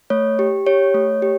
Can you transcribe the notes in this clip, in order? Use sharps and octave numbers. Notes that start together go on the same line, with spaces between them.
A3 C#5
G4
G4 C#5
A3
G4